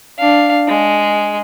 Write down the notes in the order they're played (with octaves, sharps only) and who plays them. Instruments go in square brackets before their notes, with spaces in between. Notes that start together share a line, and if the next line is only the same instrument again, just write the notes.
[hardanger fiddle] D4 F5
G#3